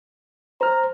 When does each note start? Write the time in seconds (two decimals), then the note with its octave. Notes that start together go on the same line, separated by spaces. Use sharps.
0.61 C5 A#5 F6